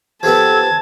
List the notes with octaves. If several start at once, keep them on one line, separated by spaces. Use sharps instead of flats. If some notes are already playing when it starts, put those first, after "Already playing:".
F3 G3 B3 A4 A5 G#6